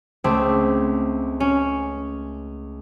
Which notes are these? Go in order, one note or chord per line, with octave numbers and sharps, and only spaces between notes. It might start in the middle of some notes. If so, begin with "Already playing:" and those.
C#2 A3 C4 D6
C#4